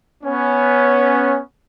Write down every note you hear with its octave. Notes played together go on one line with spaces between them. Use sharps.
B3 C#4